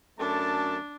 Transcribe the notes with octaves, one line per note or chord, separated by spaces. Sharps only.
F#2 A3 D4 A5